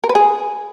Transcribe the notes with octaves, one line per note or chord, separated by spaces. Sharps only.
A#4
B4
G#4